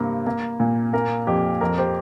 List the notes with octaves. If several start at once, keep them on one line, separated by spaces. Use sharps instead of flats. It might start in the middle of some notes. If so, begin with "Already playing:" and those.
Already playing: G2 C3 A#3
A#3
A#2
A#3 A#4
F2 G4
F2 A#4
G4 C5